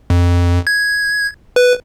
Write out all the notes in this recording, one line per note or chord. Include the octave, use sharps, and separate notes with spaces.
F2
G#6
B4